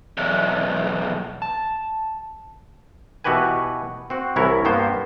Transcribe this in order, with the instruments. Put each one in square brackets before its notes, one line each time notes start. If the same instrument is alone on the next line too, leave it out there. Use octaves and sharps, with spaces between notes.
[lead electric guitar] B1 E2
[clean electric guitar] A5
[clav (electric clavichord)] B2 E3 F#4 G4 B4 G#5
C4 F#4
C2 E3 E4 A#4 C#5
G2 A#3 B3 C5